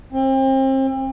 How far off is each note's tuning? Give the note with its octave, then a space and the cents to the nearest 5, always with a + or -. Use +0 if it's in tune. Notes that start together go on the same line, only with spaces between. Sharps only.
C4 +35